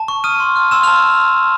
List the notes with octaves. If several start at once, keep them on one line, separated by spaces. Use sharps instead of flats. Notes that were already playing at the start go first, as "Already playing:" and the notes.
Already playing: A5
C#6
D#6 F6 D#7
C6
F6
C6 E6 E7
A5 F6 F7